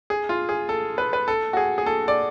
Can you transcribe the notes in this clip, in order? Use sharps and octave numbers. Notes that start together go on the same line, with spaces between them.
G#4
F4
G#4
A4
B4
B4
A4
F#4
G#4
G#4
A4
D5